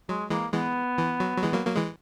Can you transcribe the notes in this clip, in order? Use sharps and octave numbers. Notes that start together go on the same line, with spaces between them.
F#3 G#3
E3 G#3 A#3
E3 G#3 B3
E3
F#3
F#3
E3 G#3
F#3 A#3
F#3 A#3
E3 G#3